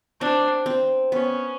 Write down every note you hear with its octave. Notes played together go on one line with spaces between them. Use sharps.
C4 D4
C4
B3 C#4